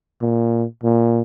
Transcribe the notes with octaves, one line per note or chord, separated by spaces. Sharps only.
A#2
A#2